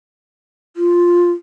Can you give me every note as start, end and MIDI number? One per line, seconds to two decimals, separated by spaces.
0.76 1.32 65